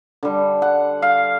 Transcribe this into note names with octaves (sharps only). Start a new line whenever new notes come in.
D3 G3
F#5
F5